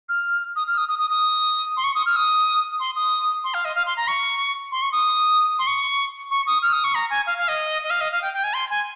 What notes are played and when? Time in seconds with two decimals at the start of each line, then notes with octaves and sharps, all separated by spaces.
0.09 F6
0.56 D#6
0.68 F6
0.78 D#6
0.89 D#6
0.99 D#6
1.10 D#6
1.77 C6
1.84 C#6
1.95 D#6
2.06 F6
2.16 D#6
2.80 C6
2.96 D#6
3.44 C6
3.54 F5
3.65 D#5
3.75 F5
3.86 C6
3.97 A#5
4.08 C#6
4.72 C6
4.82 C#6
4.92 D#6
5.59 C6
5.67 C#6
6.31 C#6
6.47 D#6
6.62 F6
6.73 D#6
6.84 C#6
6.95 A#5
7.10 G#5
7.27 F5
7.38 F5
7.48 D#5
7.83 D#5
7.90 F5
8.01 D#5
8.12 F5
8.22 G5
8.33 G5
8.44 G#5
8.54 C6
8.70 G#5